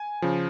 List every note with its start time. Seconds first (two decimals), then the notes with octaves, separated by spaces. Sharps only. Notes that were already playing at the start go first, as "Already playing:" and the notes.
Already playing: G#5
0.22 C#3 F3